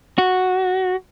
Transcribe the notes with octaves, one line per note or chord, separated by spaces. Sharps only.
F#4